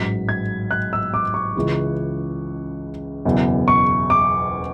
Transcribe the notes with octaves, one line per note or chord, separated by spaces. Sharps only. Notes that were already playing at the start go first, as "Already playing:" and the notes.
Already playing: A1 G#2 F#3 B6
G#6
F#6
E6
D6
C#6
C#2 C#3 E3
F#1 E2 B2
C#6
D6